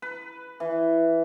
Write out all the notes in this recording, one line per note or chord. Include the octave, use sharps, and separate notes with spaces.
B4
E3